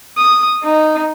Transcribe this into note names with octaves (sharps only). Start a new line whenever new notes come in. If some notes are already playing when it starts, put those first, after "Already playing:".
D#6
D#4